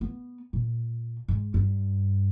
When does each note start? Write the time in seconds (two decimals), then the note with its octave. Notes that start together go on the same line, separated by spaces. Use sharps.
0.01 B3
0.53 A#2
1.28 G#2
1.54 G2